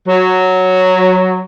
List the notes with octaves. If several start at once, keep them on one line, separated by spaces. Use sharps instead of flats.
F#3